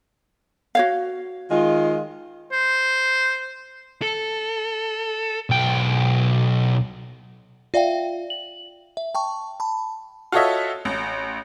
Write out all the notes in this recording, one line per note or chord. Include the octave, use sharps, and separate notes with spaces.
F#4 C#5 F5
D#3 G#3 F4
C5
A4
B1 G5
F4 D5 E5 F5 G5
F#7
E5
G5 A5 C#6
A5 B5
F4 F#4 A4 C#5 D#5 E5
A1